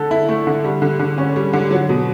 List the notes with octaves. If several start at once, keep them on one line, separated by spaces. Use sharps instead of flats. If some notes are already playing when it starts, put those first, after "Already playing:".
Already playing: D3 A4
E4
A3
D3
G3
D3
D3
C#4
G3
D3
F#3
B2